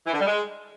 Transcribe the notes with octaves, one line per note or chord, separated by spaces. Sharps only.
E3
D3
G3
G#3